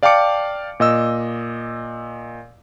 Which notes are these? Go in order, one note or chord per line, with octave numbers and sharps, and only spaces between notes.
D5 F5 G5 A5 D6 C#7
A#2 D#5 E6